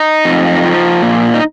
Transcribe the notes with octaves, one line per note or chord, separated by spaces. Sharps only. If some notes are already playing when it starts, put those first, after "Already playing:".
Already playing: D#4
F2
F3
A#2
D#4